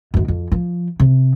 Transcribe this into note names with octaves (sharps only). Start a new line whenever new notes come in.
F#2 D#3
F2
F3
C3